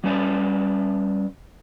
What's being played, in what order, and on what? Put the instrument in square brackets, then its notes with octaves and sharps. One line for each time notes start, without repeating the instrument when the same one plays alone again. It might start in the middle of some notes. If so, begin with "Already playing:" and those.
[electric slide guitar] G3 C#4 B4 D5